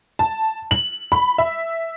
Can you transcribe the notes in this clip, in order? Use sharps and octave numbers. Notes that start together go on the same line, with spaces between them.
A5
F#7
B5
E5